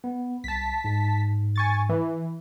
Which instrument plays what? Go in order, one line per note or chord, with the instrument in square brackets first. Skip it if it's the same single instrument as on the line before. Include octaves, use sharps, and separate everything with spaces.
[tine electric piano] B3
[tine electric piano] C2 [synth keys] A5 B6
[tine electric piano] G#2
[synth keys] G#5 C#6 A6
E3